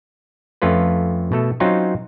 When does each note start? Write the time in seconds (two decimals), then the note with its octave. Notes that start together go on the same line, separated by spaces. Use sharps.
0.62 F2 A3 C#4 F4 B4
1.32 B2 A3 A4
1.60 F#3 C4 C#4 D#4 F4